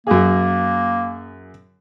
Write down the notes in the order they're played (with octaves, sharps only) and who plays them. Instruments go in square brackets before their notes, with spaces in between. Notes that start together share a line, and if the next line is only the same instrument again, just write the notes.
[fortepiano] F#2 G#4 [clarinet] A#3